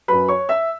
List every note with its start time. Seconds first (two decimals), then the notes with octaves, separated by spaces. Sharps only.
0.08 F#2 F#3 B4 B5
0.28 C#5 C#6
0.49 E5 E6